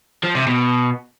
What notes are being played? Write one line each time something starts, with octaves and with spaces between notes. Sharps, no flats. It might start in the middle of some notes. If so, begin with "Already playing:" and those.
F3
C3
B2